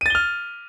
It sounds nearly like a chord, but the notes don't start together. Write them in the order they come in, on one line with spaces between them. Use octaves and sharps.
D#7 A6 G7 F6